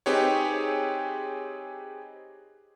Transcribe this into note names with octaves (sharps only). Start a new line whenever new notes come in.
C4 D#4 G4 G#4 B4 C#5